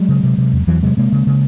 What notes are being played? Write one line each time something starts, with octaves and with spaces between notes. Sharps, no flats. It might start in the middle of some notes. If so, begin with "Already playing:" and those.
Already playing: F#3 G#3
C#3
C3
C3
E2
E2 E3 F#3
C3 F#3 G#3
C3 G#3 A#3
C#3
C#3